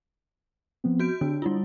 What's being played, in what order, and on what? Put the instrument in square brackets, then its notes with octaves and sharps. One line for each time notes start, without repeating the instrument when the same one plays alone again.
[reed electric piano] F3 B3 C4
[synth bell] F#4 G6 D7
[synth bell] D3 [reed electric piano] D4
[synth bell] G3 E4 F4